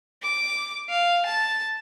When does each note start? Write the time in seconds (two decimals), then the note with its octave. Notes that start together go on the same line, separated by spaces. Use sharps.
0.22 D6
0.90 F5
1.26 A5